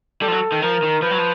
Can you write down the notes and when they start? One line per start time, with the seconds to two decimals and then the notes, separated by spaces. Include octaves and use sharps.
0.22 G3 A4
0.28 F3
0.32 F#3
0.52 D#3
0.62 F3 A#4
0.82 D#3
1.02 F3 B4
1.11 F#3
1.18 F3